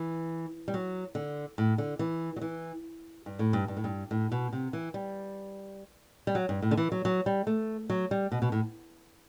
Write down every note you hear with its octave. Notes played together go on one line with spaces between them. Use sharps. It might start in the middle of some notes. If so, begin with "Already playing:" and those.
Already playing: E3
G3
F#3
D3
A2
D3
E3
F#3
E3
G2
A2
G2
G2
A2
G2
A2
B2
C3
E3
G3
G3
F#3
G2
A2
D3
E3
F#3
F#3
G3
A3
F#3
G3
B2
B2
A2